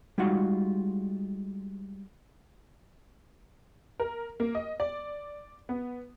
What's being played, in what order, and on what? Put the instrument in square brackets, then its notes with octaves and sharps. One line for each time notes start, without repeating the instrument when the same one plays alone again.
[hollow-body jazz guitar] G3 G#3 D#4 F4 F#4 F#5
[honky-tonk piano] A#4
A#3
D#5
D5
B3